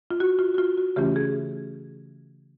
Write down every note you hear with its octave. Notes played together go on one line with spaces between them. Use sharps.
F4
F#4
F4
F#4
F4
F#4
C#3 E3 A3 C#4 F4 G4
G#4